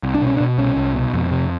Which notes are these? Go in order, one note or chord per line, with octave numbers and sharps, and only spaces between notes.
C2
D4
B2
C#4
D4
B2
C2 C#4
C2
B2
F2
C3